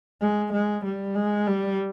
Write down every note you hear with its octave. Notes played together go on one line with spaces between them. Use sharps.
G#3
G#3
G3
G#3
G3